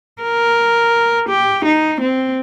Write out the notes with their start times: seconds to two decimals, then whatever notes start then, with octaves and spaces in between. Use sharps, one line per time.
0.22 A#4
1.29 G4
1.65 D#4
2.00 C4